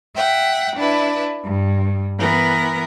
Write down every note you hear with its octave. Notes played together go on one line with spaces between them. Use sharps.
E5 F#5 G5
D4 E4 B4
G2
E3 B3 A#4 B4